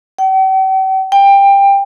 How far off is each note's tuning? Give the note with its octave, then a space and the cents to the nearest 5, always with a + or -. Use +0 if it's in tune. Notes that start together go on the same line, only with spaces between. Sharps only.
G5 -45
G5 +20